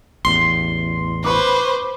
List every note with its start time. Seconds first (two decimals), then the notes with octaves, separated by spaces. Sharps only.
0.25 A1 E2 C6
1.24 B4 C5 B5 C#6 D6